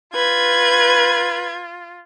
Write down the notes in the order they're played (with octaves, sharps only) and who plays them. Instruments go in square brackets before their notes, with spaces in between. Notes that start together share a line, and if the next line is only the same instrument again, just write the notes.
[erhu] F4 [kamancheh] B4 [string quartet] G#6